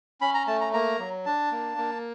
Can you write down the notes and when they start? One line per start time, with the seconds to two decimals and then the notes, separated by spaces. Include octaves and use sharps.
0.21 C#4 B5
0.34 A#5
0.47 A3 A5
0.61 A#5
0.73 A#3 A#5
0.99 F#3
1.26 D4 A5
1.51 A#3
1.77 A#3